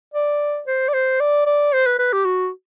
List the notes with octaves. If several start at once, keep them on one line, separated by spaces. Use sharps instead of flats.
D5
C5
D5
C5
D5
D5
C5
B4
B4
G4
F#4